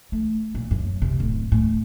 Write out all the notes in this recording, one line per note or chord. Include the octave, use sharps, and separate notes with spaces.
A3
A#2
F#2
C3
D1
A2